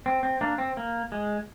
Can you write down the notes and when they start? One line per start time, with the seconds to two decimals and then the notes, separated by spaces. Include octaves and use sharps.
0.06 C4
0.23 C4
0.41 A#3 D4
0.58 C4
0.77 A#3
1.12 G#3